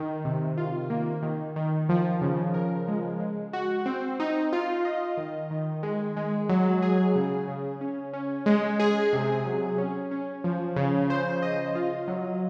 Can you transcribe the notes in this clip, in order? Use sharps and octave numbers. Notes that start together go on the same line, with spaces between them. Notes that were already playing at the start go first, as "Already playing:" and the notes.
Already playing: D#3
C3
F4
A#3
D#3
D#3
F3
C#3
A#4
G#3
G#3
F#4
C4
D#4
F4
D#5
D#3
D#3
G#3
G#3
F#3
G#4
C#3
C#3
C#4
C#4
G#3
G#4
C3
F#3
C#4
C#4
F3
C#3
C5
D#5
F4
F#3